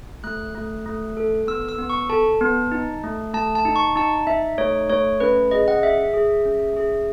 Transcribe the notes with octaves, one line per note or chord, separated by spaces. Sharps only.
A3 F#6
A3
A3
A4
B3 E6
E6
B3
C#6
A4 A5
B3
D#4
A3
A3 A5
A5
D#4
C#6
D#4 A5
D#4 E5
A3 C#5
A3 C#5
C#4 B4
G#4 D#5
F#5
G#4 E5
G#4
C#4
G#4